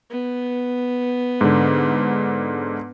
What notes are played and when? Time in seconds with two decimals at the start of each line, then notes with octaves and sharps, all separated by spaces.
0.11 B3
1.41 G#2 D3